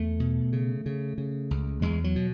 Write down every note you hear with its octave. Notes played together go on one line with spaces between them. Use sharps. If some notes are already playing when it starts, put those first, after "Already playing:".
Already playing: E2 A3
B2
C#3
C#3
C#3
C#2
E2 G#3
F#3
B2